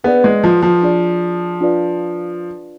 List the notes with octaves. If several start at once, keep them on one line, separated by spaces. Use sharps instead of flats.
B3 D4 G#4 B4 D5 F#5
G#3
F3
F3
D4 G#4 D5
D4 F4 B4 D5 F5